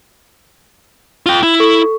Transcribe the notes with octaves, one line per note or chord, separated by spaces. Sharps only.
F4 G5
E4
A4 C#6